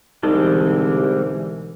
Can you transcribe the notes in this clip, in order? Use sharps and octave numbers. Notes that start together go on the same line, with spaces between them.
C2 B2 D3 E3 G3 G#3 C4 D#4